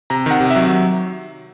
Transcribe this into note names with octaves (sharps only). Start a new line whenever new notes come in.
C3 A#5
D#3 F#5
C3
E5
F#3